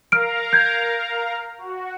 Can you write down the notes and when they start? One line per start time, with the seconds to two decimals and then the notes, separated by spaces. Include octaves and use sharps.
0.12 A#4 F5 A#5 F6 D7
0.53 G6 G#6
1.58 F#4